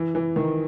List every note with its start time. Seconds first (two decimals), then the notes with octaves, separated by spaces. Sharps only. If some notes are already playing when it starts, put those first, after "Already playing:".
Already playing: E3
0.15 E3
0.36 D#3